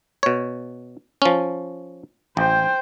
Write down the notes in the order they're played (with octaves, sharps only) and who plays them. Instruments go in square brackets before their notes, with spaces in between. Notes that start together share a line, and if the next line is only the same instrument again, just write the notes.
[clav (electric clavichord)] B2 C#5
F3 C#4
[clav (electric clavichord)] A1 [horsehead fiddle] C5 G5